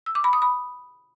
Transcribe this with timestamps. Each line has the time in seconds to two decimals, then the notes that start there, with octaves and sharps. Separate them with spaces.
0.06 E6
0.15 D6
0.24 B5
0.33 D#6
0.42 B5